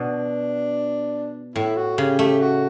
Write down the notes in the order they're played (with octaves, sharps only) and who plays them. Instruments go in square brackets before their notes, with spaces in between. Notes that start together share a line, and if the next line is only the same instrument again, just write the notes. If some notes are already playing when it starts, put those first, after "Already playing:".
Already playing: [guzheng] B2 [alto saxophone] D4
[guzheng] A2 [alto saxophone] E4
[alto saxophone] F#4
[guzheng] C#3 [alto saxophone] G4
[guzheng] A3 [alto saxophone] G4
[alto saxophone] F#4